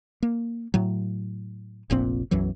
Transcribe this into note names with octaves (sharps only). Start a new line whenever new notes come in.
A#3
A2 F#3
F1 A#1 A#2 C4
B1 F#2 E3 F#3